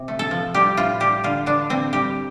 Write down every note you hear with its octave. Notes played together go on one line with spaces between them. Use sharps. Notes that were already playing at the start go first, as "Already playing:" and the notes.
Already playing: C3
A3
A4
F3
G3 G4
A2 F4
G3 G4
D3 F4
D3 D4
D3 C4
G3 G4